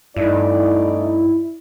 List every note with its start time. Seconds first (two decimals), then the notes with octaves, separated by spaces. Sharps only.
0.16 G2 A3 C#4 D#4 E4 D5